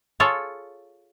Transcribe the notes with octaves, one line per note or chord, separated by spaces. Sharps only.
F4 G#4 A4 C#5